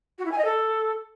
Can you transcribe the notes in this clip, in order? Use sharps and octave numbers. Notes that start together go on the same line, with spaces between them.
F#4
E4
G#5
D#5
A4